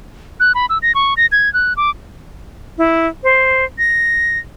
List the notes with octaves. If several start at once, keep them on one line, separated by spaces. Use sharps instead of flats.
F#6
B5
E6
A#6
C#6
A#6
G#6
F#6
D6
E4
C5
A#6